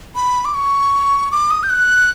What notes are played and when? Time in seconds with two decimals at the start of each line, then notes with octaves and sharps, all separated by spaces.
0.15 B5
0.45 D6
0.54 C#6
1.32 D6
1.51 D#6
1.63 G6
1.70 F#6